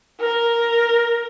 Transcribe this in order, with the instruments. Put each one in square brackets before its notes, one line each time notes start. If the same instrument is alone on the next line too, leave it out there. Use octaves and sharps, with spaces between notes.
[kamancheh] A#4